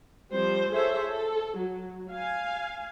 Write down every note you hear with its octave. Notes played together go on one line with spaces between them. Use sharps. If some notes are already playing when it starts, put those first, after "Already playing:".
F3 G3 C4 C5
F4 G#4 A4 C5 C#5 E5
A4
F#3
F5 G#5